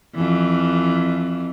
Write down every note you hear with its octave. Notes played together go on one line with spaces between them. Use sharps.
F2 E3